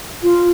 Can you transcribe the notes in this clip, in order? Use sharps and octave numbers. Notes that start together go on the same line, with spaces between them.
F4